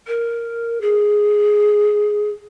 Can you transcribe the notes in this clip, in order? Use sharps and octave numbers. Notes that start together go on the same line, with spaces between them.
A#4
G#4